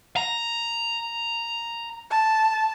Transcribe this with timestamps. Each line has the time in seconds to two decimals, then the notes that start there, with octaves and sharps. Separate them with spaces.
0.16 A#5
2.11 A5